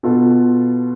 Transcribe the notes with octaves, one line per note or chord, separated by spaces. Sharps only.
B2 B3 F4 A4